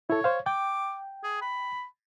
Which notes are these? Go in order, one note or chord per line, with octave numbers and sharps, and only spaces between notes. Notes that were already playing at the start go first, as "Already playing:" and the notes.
E4 A4 C#5
C5 F5
G5 D6
G#4
B5